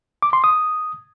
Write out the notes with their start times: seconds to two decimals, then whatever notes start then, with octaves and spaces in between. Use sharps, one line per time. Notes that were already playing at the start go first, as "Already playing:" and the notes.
0.22 D6
0.33 C6
0.44 D#6